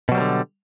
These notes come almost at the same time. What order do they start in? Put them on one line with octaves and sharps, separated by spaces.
B2 F#3 G3 A#3 D3